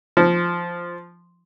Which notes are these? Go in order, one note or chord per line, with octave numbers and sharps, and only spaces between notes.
F3